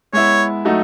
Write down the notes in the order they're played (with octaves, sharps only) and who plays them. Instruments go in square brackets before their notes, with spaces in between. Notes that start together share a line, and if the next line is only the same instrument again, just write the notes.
[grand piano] G#3 B3 E4 [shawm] C#5
[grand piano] F#3 A3 D#4 F#4